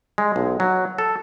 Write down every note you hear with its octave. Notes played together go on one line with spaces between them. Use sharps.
G#3
B1
F#3
A4